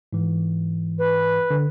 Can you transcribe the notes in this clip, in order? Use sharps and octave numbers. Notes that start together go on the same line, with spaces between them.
G#2 E3
B4
D3